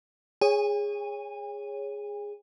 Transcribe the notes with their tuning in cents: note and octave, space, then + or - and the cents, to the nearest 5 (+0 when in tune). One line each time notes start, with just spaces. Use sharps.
G#4 -10 C#5 +0 G#5 -45